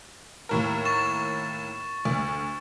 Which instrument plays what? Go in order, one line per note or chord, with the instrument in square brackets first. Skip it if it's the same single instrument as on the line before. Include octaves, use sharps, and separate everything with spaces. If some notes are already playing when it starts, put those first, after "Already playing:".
[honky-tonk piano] D#2 A2 A#4
[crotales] C#6 A6 E7
[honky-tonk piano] D2